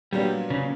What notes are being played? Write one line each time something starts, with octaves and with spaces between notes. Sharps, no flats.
A#2 F#3 G3 B3 D4
C#3